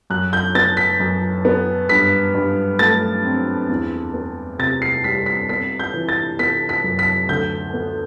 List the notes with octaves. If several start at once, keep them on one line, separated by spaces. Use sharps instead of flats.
F#2 F#6
G6
B3 A6
B6
F#2
B3
G2 B6
G2
A3 A6
C4
E2
B3
C3 A6
C7
G3 B6
B6
B3 B6
G6
E3
A6
B3 B6
B6
F#2
B6
D2 G6
B3